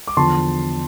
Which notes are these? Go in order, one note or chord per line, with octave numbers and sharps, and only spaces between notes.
D6
E2 D3 F3 A5 C6